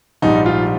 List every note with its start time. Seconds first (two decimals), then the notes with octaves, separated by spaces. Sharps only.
0.22 A#1 G#2 G3 D#4
0.46 F4